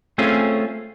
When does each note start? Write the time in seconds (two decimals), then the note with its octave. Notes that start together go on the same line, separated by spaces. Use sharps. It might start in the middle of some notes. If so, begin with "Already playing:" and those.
0.18 A3 C4 C#4 F4 G#4